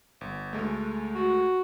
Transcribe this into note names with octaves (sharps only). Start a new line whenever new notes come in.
G1
D2 G#3 A3
F#4